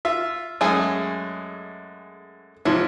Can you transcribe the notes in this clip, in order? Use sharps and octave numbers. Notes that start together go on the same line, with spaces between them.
F4 E5
F#2 G#3 A3 C#4 G#4
G#2 C3 F3 E4 C#5